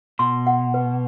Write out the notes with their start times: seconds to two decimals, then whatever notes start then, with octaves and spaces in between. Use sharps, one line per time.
0.19 B2 C6
0.47 F#5
0.74 B4